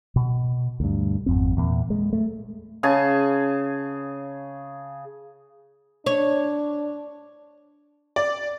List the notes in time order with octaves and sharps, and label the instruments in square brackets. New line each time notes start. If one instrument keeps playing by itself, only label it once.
[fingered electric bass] B2
D2 G2
G#1 F2 C4
E2 A#2
G#3
A3
[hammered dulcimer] C#3 G#4 G#5 A5
[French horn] D4 [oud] C#5
[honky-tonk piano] D5